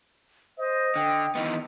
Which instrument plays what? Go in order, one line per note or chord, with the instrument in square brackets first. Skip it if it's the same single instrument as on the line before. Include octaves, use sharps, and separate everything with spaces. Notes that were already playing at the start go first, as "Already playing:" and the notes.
[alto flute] C5 [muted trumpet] D#5
[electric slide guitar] D3 [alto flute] G5
[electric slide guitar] D#3 E3 B3 [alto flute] D#5